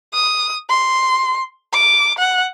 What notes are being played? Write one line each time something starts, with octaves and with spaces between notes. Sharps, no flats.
D#6
C6
D6
F#5